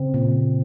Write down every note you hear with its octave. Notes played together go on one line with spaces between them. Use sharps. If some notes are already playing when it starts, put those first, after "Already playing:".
Already playing: C#3 C4
A#2